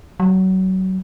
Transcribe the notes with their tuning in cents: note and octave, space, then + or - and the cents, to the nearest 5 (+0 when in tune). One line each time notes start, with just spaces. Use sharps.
F#3 +25